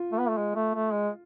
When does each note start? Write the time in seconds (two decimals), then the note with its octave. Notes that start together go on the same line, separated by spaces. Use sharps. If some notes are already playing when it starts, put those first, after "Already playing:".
Already playing: F4
0.12 A3
0.19 B3
0.29 A3
0.37 G#3
0.55 A3
0.75 A3
0.92 G#3